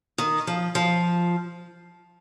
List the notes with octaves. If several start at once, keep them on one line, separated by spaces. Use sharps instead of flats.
D#3
F3
F3